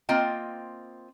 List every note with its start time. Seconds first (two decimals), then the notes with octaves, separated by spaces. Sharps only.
0.09 A#3 C4 F4 D#5 G5